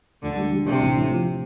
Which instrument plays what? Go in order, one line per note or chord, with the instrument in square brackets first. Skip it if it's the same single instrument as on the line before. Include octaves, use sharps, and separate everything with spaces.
[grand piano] D2 [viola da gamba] D3
[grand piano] G3
G3
[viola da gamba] C3 [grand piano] D4
[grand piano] A1
A2
F3
F3